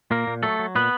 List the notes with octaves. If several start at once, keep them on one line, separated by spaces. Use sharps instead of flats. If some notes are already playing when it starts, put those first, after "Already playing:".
A#2 A#3 A#4
A#2
F#3 A3 A4
F#3
A#2 B3 B4